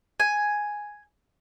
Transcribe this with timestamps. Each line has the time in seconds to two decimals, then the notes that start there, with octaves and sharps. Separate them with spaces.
0.20 G#5